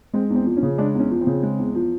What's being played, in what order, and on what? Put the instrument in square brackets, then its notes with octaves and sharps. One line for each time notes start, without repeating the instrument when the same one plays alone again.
[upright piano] G#3 C4
E2 C4
F3
C#4
C#3
G#3 D4
E2
C#4
F3
C4
C#3
G#3
E2
F3